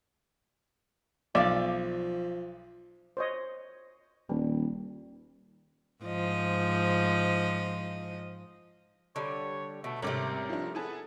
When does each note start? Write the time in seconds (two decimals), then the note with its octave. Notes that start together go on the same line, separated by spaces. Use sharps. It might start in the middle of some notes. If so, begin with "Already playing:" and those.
1.35 B1 F3 D5 E5 F5
3.17 C5 C#5 D#5
4.29 D#1 G3
6.03 G#2 F3 D#5
9.16 D3 G3 C#5
9.84 B2 A3
10.02 G#1 C3 G3 A3 C#4 A#4 D6
10.49 F3 D4
10.75 B3 E4 G#4 A4